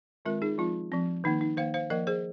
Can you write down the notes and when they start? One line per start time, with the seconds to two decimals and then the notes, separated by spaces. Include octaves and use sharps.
0.25 D#3 G#3 C4 F4 A#4
0.42 D#4 G#4
0.58 F3 G#3 C4 F4
0.92 F3 C4
1.24 D#3 A#3 D#4
1.41 D#4
1.57 D#3 A#3 C5 F5
1.74 C5 F5
1.90 F3 A#3 A#4 D#5
2.07 G#4 C5